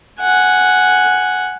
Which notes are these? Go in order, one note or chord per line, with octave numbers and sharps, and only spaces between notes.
F#5 G#5